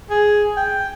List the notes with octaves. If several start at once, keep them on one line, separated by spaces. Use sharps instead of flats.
G#4
G5